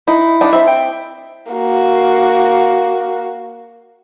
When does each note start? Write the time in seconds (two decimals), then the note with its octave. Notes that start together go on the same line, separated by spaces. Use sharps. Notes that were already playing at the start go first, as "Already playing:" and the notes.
0.08 D#4 E4
0.41 D4 D#4
0.53 C4 E5
0.68 G5
1.52 A#3 F#4